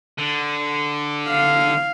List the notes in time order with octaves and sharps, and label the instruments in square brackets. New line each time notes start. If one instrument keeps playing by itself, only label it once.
[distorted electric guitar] D3
[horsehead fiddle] F5